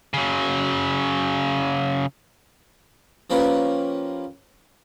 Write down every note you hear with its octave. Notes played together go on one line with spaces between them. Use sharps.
C#3 F#3
F3 A#3 C#4 G4 B4